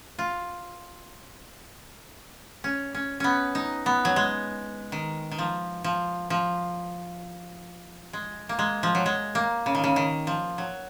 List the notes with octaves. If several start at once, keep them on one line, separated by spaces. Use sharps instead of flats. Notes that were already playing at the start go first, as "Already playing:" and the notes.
F4
C#4
C#4
B3 C#4
D#4
B3
F#3
G#3
D#3
D#3
F3
F3
F3
G#3
A#3
G#3
F3
F#3
G#3
A#3
C#3
D#3
C#3
D#3
F3
F#3